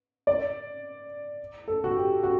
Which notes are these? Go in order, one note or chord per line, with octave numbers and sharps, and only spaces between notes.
D5
A4
F#4
G4
F#4